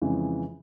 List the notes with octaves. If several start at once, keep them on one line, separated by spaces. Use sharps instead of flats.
F2 C#3 E3 G#3